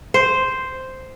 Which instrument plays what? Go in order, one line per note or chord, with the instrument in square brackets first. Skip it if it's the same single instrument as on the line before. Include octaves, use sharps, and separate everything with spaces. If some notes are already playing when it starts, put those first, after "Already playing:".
[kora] C5